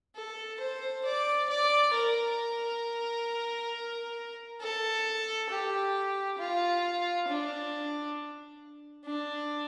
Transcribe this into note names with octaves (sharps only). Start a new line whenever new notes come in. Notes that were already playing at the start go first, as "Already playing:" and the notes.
A4
C5
D5
D5
A#4
A4
G4
F4
D4
D4